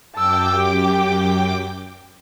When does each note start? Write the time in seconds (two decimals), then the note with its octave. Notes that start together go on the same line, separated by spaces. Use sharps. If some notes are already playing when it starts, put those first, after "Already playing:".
0.15 F#2 G5 A5 D6 E6
0.57 G4